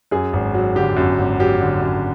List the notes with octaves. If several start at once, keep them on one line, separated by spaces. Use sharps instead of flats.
F#2 G#4
G#1
F#3
D3 G4
F#2
G#1
F#3 G4
D3
F#2